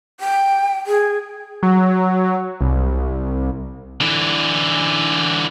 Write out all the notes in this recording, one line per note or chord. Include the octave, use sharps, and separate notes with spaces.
G5
G#4
F#3
C2
D3 E3